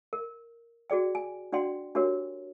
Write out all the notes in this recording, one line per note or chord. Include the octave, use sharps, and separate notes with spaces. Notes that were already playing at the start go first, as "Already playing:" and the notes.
A#4
F#4 G#4 D5 G5
G#5
D4 F#4 D5 F#5 G5 C6
D4 F#4 G4 A#4 C#5